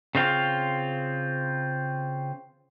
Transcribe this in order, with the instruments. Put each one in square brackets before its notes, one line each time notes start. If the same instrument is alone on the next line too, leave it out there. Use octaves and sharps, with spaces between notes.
[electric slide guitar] C#3 C4 F4